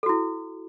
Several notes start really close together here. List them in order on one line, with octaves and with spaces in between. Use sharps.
A4 F#4 E4